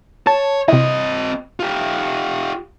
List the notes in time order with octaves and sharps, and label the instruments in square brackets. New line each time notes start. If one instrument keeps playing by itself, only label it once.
[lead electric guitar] C#5 [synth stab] A5
[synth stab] C3 E4 [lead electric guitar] C4 D#5
[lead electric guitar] F4 G4